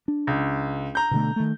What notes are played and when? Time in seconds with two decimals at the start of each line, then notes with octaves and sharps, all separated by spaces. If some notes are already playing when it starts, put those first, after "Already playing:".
0.08 D4
0.27 C#2
0.95 A#5 G6
1.11 B2 D3 A3
1.36 D#3 A3